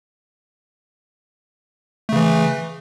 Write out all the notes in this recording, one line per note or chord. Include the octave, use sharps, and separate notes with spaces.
C#3 E3 A3